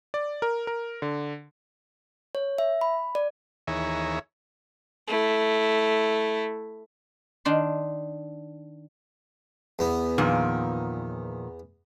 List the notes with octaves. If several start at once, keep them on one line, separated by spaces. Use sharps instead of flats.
D5
A#4
A#4
D3
C#5
E5
B5
D5
D#2 E3 G#4 C#5 E5 A#5
A3 E4
D#3 D4 C6
E2 B3
A#2 D#3 F3